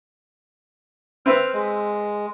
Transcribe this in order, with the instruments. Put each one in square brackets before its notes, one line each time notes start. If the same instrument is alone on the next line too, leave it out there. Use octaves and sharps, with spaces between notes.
[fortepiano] C4 B4 E5 [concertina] F6
[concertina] G#3